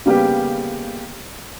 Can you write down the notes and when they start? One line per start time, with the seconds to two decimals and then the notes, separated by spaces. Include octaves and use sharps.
0.06 C#3 G3 A#3 B3 G4